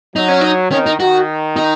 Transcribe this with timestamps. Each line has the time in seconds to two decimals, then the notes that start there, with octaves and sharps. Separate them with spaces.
0.16 F#3 D#4
0.29 C#4
0.41 D#4
0.72 D#3 C#4
0.86 D#4
1.00 D#3 F#4
1.56 D#4